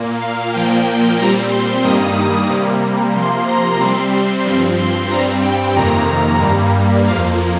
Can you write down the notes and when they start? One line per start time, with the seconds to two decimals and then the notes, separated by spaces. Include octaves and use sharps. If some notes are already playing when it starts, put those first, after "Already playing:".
Already playing: A#2 A#3
0.21 F5
0.53 A#2 F3 A#3 G5
1.19 A#2 G3 C4 A#5
1.51 C6
1.84 G2 D#3 G3 A#3 D#6
2.17 D#6
2.49 C3 G3 A#3
3.16 C3 F3 A#3 C6
3.48 A#5
3.80 C3 G3 C4 C6
4.45 G2 F3 C4 C6
4.78 C6
5.11 G2 G3 C4 A#5
5.43 G5
5.76 F2 C3 D#3 A#3 A#5
6.41 G2 G3 A#3
7.06 F2 F3 A#3 F5